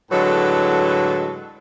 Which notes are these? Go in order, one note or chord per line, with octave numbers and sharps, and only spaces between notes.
A2 D3 F#3 G#3 A4 B4